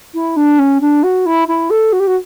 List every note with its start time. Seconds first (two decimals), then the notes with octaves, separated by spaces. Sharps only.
0.14 E4
0.37 D4
0.59 C#4
0.81 D4
1.03 F#4
1.26 E4
1.48 E4
1.70 A4
1.92 F#4
2.00 G4
2.07 F#4